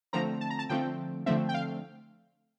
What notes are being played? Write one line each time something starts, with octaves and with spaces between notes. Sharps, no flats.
D3 F3 A3 C4 A#5
A5
A#5
A5
D3 F3 A3 C4 G5
D3 F3 A3 C4 E5
G5
F5